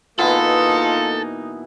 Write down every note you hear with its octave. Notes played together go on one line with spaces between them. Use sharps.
B2 E3 A#3 B3 D#4 F4 A4